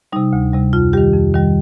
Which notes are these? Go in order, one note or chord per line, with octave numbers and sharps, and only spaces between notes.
C3 G3 D#4
D2
C3 G3
F2 F4
D#3 G3 G4
F2
D#3 G3